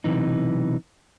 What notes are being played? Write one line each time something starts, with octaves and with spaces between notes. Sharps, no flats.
B1 C3 E3 D#4